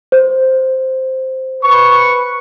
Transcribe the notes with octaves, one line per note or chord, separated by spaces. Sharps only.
C5
B4 C#6